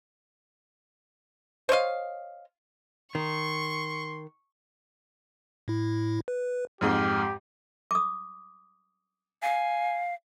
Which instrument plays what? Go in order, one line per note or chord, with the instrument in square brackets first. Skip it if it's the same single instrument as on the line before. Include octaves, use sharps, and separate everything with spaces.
[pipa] C5 C#5 D#5 F5
[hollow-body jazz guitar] D#3 [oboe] C6 [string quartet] C#6
[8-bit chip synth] A2 E4
B4
[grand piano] F2 G#2 G#3 [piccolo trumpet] G4 [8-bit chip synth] F6
[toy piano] D6 D#6
[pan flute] F5 [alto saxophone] G#5